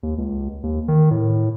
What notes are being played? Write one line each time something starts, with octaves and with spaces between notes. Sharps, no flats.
D#2
C#2
D#2
D#3
A2